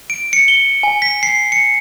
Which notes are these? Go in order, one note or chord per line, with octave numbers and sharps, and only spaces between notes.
D7
C#7
G7
G#5
B6
C7
C#7